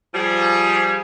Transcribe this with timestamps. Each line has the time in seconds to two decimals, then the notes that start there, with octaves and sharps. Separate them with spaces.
0.14 F3 G3 G#4